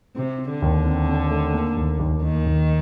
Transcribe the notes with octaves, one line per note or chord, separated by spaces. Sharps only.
C3 C4
C4
D3
D#2
C4
C4
A3
A#3
D#2
D#2
D#3 A#3
D#2